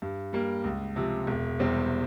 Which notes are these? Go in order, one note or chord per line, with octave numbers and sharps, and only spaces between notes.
G2
G3 A#3
C#2
C3 F3
E1
E2 C3 G3 C4